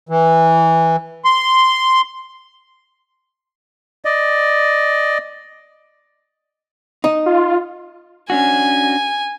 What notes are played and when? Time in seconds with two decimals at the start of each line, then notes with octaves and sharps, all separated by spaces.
0.09 E3
1.25 C6
4.05 D5 D#5
7.04 D#4
7.26 F4
8.30 C#4 D4 F#4 G#5